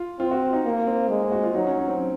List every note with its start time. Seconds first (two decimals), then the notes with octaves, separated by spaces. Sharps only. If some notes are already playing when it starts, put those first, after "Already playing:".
Already playing: F4
0.19 C4 F4
0.31 F#4
0.53 D#4
0.65 A#3
0.87 C4
1.09 G#3 A#3
1.21 C4
1.32 F#4
1.43 F4
1.54 F#3 D#4
1.66 C#4
1.78 C#4
1.88 C4